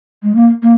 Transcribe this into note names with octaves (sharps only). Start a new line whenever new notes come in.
G#3
A#3
A#3